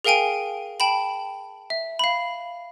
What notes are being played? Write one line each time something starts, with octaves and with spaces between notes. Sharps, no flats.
G#4 A#4 F5 G5 G#5 D7
G5 A5 B5 F#7
E5
F5 B5